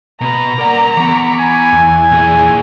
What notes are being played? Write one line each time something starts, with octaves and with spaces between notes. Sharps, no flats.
B2 B4 A#5
A#3 A#4 D5 F#5
E3 B3 B5 C#6 D6
G#5
E2
A#2 G#4